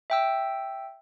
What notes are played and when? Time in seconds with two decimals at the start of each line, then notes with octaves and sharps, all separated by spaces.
0.10 E5 G5 E6